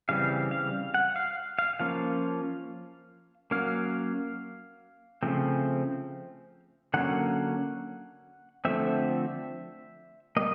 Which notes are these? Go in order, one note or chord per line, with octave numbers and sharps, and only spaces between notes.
C#3 E3 G3 C4 F5
F5
F#5
F5
F5
F3 A#3 C#4 F5
F#3 A#3 C#4 F5
C#3 F3 A3 C4
D3 F#3 A#3 C#4 F#5
D3 F3 A3 C4 E5
G3 A#3 D#5